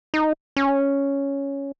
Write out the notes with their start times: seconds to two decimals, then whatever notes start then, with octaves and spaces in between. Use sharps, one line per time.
0.14 D#4
0.56 C#4